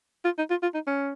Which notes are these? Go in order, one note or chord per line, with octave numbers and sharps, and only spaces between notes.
F4
D#4
F4
F4
D#4
C#4